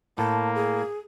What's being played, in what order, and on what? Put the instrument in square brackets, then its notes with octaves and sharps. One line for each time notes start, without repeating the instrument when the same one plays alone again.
[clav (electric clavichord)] A2 [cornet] A#3 [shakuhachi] A5
[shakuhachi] G#4